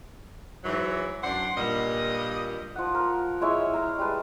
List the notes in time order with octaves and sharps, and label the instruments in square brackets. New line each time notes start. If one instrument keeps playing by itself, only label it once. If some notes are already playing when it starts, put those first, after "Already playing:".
[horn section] G#2 E3 F#3
[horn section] F#2 D4 C6 [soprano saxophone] F#5
[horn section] G2 A#2 G3 [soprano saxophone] D#5
[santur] F3 F#5
A#4
G#3 E4 C#5 E5
F5 A#5
G3 G#3 B4 A5